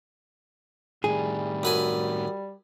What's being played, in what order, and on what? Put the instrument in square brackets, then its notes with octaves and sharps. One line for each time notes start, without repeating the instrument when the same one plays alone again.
[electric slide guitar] A2 D#3 [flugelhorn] G3 [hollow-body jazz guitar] G#4
[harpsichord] F#2 B4 G#5